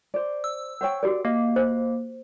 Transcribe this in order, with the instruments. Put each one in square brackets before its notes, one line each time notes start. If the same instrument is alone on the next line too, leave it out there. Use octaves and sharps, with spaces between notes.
[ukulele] C5 D5
[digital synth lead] E6
[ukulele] C5 C#5 G5 [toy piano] F#5
[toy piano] F#4 G4 A#4 [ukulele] D5
[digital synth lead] A#3 [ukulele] D#5
[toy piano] C5